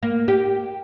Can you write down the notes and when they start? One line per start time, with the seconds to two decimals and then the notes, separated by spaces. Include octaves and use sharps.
0.03 A#3
0.28 G4